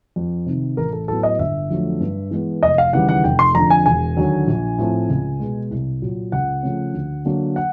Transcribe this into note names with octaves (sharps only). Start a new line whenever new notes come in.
F2
C3 D#3
A1 A#4
A4
A2 F#3 B3 A4
D#5
G1 E5
F2 D3 F#3 A3
G2
E3 G#3 B3
F1 D#5
F5
D#2 C#3 E3 G3 F#5
F#5
F1 G5
C6
F2 D3 A#5
G#5
E1 G#5
D#2 D3 F#3
A#1
A2 F3 A3 C4
C#2
B2 G#3
C2
A#2 F#3
C#2 F#5
C#3 F3 A3 C#4
D2
D3 F#3 A#3
F#5